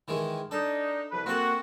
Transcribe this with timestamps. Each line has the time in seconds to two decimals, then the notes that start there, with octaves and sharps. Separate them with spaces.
0.08 D#3 E3 G#3
0.51 D4 D#4 A4
1.12 C2 F3 B4
1.26 A#3 C4 F#4 A4